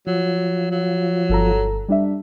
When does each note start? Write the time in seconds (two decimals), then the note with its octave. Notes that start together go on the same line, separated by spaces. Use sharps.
0.07 F3 F#3
0.71 F#3
1.29 G1 A4 A#5
1.89 G3 D4 E5